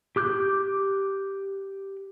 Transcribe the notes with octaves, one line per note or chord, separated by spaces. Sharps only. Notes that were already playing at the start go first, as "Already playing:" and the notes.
G4 D6 F#6 G6